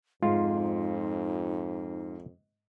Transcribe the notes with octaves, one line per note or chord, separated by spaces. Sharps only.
F2 G#2 D#4 F4